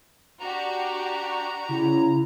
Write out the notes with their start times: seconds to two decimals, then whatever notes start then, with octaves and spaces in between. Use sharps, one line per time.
0.40 D4 F#4 G4 A#5
1.69 C#3 E4